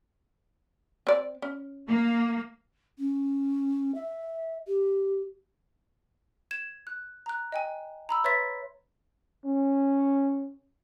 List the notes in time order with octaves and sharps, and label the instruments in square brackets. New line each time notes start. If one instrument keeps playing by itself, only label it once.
[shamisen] C4 D5
C#4
[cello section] A#3
[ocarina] C#4
E5
G4
[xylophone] G#6 E7
F#6
A#5 F#6
D#5 G5 G#5
A#5 B5 E6
B4 C#5 E5 C6 A6 B6
[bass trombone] C#4